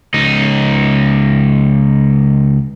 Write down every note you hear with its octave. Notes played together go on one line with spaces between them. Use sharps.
C#2 D#4